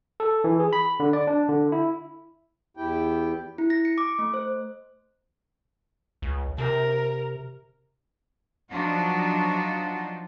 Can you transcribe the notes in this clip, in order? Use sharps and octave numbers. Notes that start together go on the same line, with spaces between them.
A4
E3
G#4
B5
D3
D5
D4
D3
E4
E2 E4 G4 G5
E4
A#6
C#7
D6
A3
C5
C#2
C3 A#4
F3 F#3 D4 D#4 F4 F#4